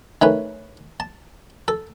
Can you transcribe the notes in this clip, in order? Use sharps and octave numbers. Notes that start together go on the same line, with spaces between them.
D#3 A3 C#4 B4
A5
A4